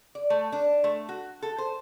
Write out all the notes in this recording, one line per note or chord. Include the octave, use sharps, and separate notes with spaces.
D5
A3
D4
A3
F#4
A4
C5